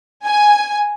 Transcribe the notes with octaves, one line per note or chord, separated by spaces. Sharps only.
G#5